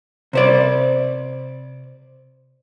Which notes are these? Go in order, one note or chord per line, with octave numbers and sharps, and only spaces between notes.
C3 C5 D5